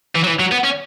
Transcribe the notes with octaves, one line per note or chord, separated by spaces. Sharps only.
E3
F#3
E3
F#3
B3
C#4